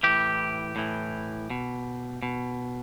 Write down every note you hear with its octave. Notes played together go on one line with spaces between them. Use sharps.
A2 E3 G4
A2 E3
B2
B2